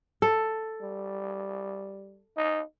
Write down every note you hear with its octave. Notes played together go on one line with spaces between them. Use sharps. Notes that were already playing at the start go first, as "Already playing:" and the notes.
A4
G3
D#4